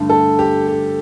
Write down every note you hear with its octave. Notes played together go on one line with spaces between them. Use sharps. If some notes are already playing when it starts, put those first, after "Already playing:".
Already playing: G2 D3 A3
A4
G4
G4